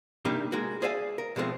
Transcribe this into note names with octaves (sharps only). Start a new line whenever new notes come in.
C3 G3 A#3 D4 D#4 G4
G#3 A#3 F#4
G#4 C5 D5 E5 F5 G#5
A#4
B2 F3 G#3 A3 C4